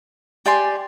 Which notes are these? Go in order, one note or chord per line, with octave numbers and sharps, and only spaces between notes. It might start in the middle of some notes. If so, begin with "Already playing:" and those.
G4 D5 G#5 C6